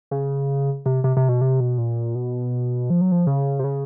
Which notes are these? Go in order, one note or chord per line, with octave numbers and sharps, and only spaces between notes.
C#3
C3
C3
C3
B2
C3
B2
A#2
B2
F3
F#3
F3
C#3
C3
C#3